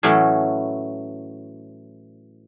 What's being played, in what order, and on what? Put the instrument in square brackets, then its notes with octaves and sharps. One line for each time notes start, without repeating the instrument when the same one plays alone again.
[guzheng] A2 E3 F#3 A3 C#4